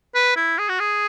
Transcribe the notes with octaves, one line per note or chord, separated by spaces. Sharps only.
B4
E4
G#4
F#4
G#4